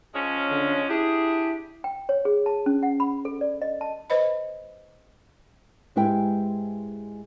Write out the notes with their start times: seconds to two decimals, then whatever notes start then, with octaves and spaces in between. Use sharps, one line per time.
0.15 F3 G#3 C#4
0.50 D3
0.89 D4 E4 G4 G#4
1.84 G5
2.09 C#5
2.25 G#4
2.46 A5
2.66 C#4
2.83 F#5
3.00 B5
3.25 A4
3.41 D5
3.62 D#5
3.81 A5
4.10 B4 C5 D#5 B5
5.96 G#2 G#3 E4 G4 B4 G5